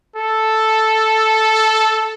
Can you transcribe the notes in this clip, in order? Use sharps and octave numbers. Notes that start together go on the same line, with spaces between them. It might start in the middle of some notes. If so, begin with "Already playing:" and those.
A4